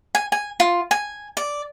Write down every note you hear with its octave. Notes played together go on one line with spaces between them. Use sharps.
G#5
G#5
F4
G#5
D5